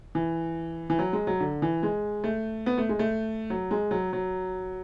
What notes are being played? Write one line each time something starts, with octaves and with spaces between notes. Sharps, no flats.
E3
E3
F#3
G#3
F#3
D3
E3
G#3
A3
B3
A3
G#3
A3
F#3
G#3
F#3
F#3